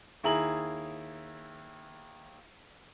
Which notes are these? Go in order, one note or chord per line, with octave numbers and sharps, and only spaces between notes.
D#2 E4 G#4 A#5 F#7